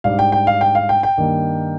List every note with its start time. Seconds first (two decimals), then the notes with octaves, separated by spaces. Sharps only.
0.04 G#2 G3 D4 F5
0.19 G5
0.32 G5
0.47 F5
0.61 G5
0.75 F5
0.89 G5
1.03 G5
1.17 G2 D#3 A#3 D#4